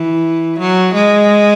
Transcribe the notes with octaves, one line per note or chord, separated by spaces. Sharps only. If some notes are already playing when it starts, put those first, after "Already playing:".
Already playing: E3
F#3
G#3